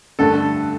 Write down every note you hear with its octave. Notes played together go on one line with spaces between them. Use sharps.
G2 D3 A3 A4